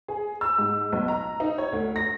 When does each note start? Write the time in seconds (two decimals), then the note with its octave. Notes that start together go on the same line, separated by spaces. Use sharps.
0.08 G#4
0.41 E6
0.58 G#2
0.92 B1
1.08 A#5
1.40 D#4
1.58 C#5
1.72 D2
1.96 A#6